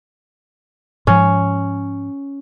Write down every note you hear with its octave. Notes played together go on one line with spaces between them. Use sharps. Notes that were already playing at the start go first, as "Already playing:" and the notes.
G#2 F3 C#4